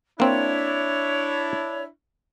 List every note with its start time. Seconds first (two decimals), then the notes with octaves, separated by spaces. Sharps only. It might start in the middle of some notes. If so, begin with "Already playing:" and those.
0.20 A#3 C4 D4 E4 C#5